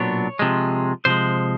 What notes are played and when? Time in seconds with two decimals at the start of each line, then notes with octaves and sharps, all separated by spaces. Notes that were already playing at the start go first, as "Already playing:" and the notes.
Already playing: B1 A#2 F#3 B3 D4 C#5
0.39 C3 F3 G#3
1.05 C3 F3 G#3 C5